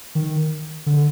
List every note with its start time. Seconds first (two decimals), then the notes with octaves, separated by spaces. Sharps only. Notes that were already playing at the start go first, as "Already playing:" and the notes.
0.15 D#3
0.86 D3